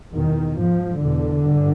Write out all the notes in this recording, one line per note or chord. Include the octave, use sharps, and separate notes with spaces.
E2 B2 D#3
G#2 F3
E2 B2 D3
G2